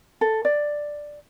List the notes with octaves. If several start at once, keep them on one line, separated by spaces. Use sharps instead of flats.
A4
D5